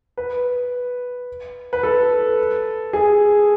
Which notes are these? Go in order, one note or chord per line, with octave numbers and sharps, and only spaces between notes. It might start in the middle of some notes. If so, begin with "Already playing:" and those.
B4
B4
A4
G#4